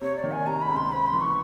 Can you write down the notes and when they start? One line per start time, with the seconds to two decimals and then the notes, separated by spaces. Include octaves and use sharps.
0.01 C3 C#5
0.16 D5
0.24 D#3
0.31 G#5
0.46 C3 A#5
0.62 B5
0.69 C#2
0.76 C6
0.91 C4 B5
1.07 C6
1.13 E3
1.21 C#6